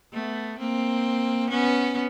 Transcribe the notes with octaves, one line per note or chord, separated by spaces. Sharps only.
A3 B3
A#3 C4
B3 C#4